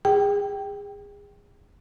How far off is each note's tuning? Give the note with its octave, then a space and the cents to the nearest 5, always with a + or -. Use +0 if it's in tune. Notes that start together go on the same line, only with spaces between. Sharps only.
G#4 -30 G5 +0